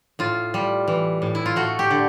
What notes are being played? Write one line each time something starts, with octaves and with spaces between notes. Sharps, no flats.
A2 F4
G3
E3
A2
E4
F4
A3 F#4
G4
D3